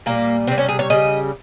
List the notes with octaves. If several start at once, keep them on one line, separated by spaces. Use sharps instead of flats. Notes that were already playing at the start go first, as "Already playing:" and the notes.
A#2 G3 A#3
C3 G3 C4
C#4
G#4
C#5
C#3 G3 D#5